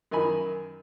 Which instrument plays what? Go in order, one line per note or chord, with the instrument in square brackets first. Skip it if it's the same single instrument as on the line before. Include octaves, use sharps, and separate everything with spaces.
[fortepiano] F#2 D#3 D#5 G#5 B5